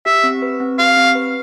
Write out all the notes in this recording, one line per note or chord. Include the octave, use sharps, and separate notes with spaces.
G4 E5
C4
B4
C4
G4 F5
C4
B4